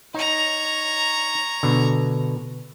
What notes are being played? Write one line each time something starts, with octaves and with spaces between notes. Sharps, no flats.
D#4 C#5 A#5
B2 D3